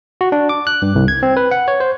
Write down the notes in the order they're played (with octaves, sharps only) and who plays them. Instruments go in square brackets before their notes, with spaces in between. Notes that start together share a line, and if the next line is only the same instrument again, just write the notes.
[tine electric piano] F#4
D4
D6
F#6
G2
C2
G#6
C4
B4
F#5
C#5
C5